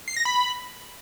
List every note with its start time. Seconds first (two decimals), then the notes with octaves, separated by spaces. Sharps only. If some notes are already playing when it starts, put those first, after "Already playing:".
0.08 C7
0.16 A#6
0.25 B5